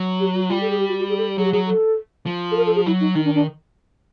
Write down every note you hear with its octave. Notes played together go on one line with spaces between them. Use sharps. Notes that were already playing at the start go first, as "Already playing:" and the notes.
Already playing: F#3
G4
F#4
G3 F4
A4
G#4
G4
F#4
F#4
G#4
A4
F#3 G#4
G4
F#3 G#4
A4
F3
A4
A#4
A4
G#4
F#3 E4
D#4
D#3 D#4
D4
D4